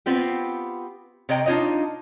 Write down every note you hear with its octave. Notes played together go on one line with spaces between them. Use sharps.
B3 C4 F4 G4
C3 C#5 D#5 G5 A#5
D4 D#4 F4 C#5 D#5